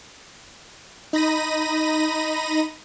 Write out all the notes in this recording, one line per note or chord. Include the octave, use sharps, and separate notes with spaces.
D#4 B5 A#6 D#7